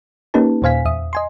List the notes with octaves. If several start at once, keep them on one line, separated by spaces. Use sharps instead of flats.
A#3 C#4 D#4 G4 B4 A5
D#2 A#2 C5 F5 G#5 B6
E2 E5 D#6
D#5 G#5 C6